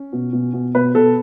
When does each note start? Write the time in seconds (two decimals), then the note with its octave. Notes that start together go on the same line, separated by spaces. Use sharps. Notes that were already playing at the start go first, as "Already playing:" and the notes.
Already playing: C#4
0.13 B2
0.33 B2
0.54 B2
0.75 B2 B4
0.94 B2 A4